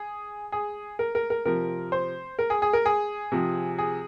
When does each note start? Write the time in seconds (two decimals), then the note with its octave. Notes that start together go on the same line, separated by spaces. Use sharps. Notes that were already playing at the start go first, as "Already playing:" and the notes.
Already playing: G#4
0.52 G#4
0.99 A#4
1.15 A#4
1.30 A#4
1.45 C3 F3 A#4
1.92 C5
2.39 A#4
2.50 G#4
2.62 G#4
2.73 A#4
2.85 G#4
3.32 C3 F3
3.78 G#4